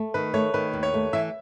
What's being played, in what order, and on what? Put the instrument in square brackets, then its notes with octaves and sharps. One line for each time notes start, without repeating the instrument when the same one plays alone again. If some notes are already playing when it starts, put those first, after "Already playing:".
Already playing: [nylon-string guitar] A3
[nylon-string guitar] D#3 [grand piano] B4
[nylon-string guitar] A3 [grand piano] C#5
[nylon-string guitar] D#3 [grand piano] B4
[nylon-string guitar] D#2
[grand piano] C#5
[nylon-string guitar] A3
[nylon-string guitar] E3 [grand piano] E5